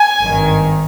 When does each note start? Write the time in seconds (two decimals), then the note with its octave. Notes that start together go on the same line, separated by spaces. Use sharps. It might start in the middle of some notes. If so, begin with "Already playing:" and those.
Already playing: G#5
0.22 G#1 G2 D#3